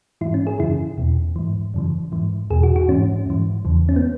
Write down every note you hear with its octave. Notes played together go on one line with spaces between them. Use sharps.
G#2 E3 E4
C#4
G#4
F#2 C#3 E3 E4
E2 B2
G#2 E3
F#2 C#3 E3
G#2 E3
E2 B2 G#4
F#4
F#4
G#2 E3 C#4
G#2 E3
E2 C#3 E3
C#4
B3